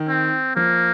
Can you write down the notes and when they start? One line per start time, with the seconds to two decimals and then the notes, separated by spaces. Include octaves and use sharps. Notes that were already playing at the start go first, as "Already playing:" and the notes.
Already playing: D#3
0.08 C4
0.56 F3 A#3